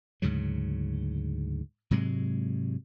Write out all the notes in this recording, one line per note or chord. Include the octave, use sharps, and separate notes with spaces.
D2 G#2 C#3 F#3
G#2 C3 F#3 G#3